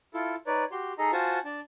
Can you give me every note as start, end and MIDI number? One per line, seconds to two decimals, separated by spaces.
0.14 0.35 64
0.14 0.35 65
0.14 0.35 69
0.47 0.64 63
0.47 0.64 71
0.47 0.64 73
0.47 0.64 74
0.71 0.93 66
0.71 0.93 67
0.71 0.93 84
0.98 1.11 63
0.98 1.11 68
0.98 1.11 69
0.98 1.11 75
0.98 1.11 82
1.13 1.39 65
1.13 1.39 66
1.13 1.39 72
1.13 1.39 78
1.13 1.39 80
1.13 1.39 81
1.45 1.60 62
1.45 1.60 81